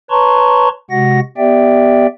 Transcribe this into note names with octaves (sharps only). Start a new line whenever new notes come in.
B4 C#5 A5 A#5 C6 C#6
C3 G#3 F#4 F#5 A#6
B3 G4 D5 E5 G5